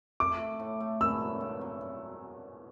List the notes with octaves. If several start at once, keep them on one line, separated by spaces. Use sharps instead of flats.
A3 D6
A3
A2
A3
B3 E6
F#3
G2
F#3